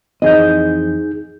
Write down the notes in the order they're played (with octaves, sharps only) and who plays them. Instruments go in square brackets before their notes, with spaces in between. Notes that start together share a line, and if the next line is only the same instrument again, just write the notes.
[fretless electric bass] F2 E3 C4 [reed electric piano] D#4 G#4 G6 [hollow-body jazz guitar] D#5